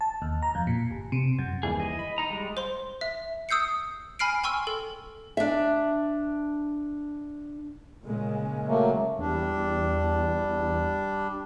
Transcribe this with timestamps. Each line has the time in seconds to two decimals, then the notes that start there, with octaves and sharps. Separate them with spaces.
0.01 A5
0.22 D#2
0.43 A#5
0.55 F2
0.67 A#2
0.91 G1
1.12 C3
1.39 F#2
1.63 D#2 E3 G3 G#4
1.80 D#5
1.99 B5
2.18 D#4 A#5
2.30 G3 G#3
2.57 C5 C6
3.01 E5
3.49 D#6 E6 G6 C7 C#7
4.19 G#5 B5 F6 C7 D7
4.44 G5 G#5 C6 C#6 E6 F6
4.67 A4
5.37 D4 E5
8.05 A#2 C#3 G#3
8.67 F#3 A3 A#3
9.19 E2 G3 D4